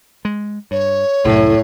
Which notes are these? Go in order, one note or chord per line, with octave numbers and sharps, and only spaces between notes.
G#3
G2 C#5
C2 F#2 A2 E4 A4